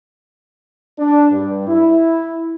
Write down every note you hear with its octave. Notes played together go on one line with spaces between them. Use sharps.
D4
G2
E4